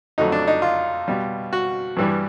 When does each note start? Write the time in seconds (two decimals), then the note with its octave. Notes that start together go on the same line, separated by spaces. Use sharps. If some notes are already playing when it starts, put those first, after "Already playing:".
0.18 F2 D3 F#3 A3 D#4
0.32 D4
0.47 D#4
0.62 F4
1.08 B2 G3
1.53 F#4
1.97 G2 E3 G3